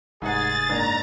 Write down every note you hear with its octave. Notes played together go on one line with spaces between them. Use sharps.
F1 G#2 G#3 G#4 F#5 A6
F#1 G#2 D4 A#5